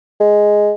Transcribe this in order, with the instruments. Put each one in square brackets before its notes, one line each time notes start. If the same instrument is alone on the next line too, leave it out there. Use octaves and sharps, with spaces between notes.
[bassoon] G#3